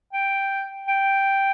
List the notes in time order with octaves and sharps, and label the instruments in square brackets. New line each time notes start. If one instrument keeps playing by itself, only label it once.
[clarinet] G5
G5